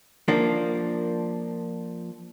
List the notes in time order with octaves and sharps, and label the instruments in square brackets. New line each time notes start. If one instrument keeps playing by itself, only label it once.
[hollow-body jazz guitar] F3 A#3 D4